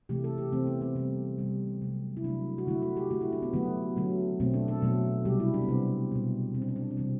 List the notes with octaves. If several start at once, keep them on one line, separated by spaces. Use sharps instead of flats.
C3 E3 A3 G4
A4
G4
C3 E3 A3 C4
B3
C4
C3 G3 C4
C3 G3
C3 F#3 A3
E4
C3 F#3 A3 D4
F#4
D3 A3 E4
F#4
G4
D3 A3 F#4
E4
D4
B3
D3 F#3 A3 B3
D3 F#3 A3
B2 F#3 A3 C4
D4
A4
B2 F#3 A3
C3 G3 G4
E4
D4
B3
C3 G3 C4
B2 G3
B2 G3 C4
D4
C4
D4
C4
D4
C3 E3 G3 C4